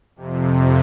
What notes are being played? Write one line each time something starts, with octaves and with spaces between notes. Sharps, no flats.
F2 C3